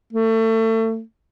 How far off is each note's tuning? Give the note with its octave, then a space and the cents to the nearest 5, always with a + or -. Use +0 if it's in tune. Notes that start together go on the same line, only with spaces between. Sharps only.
A3 +30